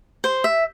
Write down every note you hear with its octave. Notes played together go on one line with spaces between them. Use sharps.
C5
E5